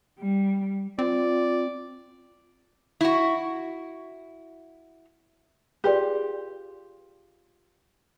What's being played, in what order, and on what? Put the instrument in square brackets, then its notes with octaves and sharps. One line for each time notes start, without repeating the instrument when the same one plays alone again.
[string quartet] G3
[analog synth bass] C4 [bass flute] F4 [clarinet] D5
[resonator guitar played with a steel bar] E4 F#4
[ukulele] F4 G4 [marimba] G#4 B4 D5